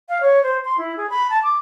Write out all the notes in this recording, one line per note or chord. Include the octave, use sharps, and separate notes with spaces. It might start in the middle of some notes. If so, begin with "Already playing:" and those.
F5
C#5
C5
C6
E4
G#4
B5
A5
D6